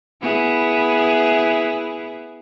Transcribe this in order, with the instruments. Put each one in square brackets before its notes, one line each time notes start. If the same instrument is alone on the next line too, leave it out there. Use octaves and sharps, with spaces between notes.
[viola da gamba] B3 E4 G#4